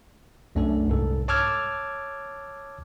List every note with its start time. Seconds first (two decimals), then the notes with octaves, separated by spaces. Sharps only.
0.55 C2 F#2 A3 D4 A4
0.88 C2 G#2 A4
1.28 C#5 A5 D6 E6 F6 G#6